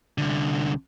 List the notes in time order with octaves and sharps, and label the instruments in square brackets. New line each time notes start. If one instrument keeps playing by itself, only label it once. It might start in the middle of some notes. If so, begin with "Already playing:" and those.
[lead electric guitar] C2 D3